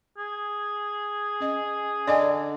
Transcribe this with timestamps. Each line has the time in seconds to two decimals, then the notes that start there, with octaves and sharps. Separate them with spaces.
0.18 G#4
1.40 C#4 D#5
2.07 D3 D5 D#5 G#5